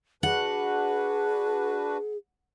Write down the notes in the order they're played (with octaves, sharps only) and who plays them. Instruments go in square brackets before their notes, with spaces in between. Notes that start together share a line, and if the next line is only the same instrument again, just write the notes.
[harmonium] D4 F#4 B4 [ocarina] G#4 [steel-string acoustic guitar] F#5